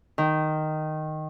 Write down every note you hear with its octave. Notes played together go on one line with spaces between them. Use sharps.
D#3